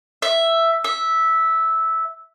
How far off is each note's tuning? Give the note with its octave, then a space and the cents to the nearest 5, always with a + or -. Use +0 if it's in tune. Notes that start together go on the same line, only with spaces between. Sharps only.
E5 +5
E5 -10